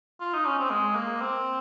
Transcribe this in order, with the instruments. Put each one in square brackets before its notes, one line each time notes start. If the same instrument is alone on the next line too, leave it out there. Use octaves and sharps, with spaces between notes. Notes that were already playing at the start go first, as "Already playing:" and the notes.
[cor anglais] F4
D#4
C#4
C4
G#3
A#3
C4